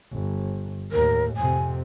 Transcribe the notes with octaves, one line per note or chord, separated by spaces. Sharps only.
G1
D#2 A2 A#4
F2 C3 G#5